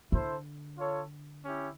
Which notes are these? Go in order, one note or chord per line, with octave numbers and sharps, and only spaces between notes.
D3 E4 A4 C5
F4 A4 C#5
C#4 E4 G4